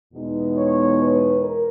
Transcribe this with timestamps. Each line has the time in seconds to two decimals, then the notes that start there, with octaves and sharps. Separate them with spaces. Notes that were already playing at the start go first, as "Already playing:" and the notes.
0.13 E2 B2 G#3 B3 D#4
0.56 C#5
0.98 B4
1.41 A#4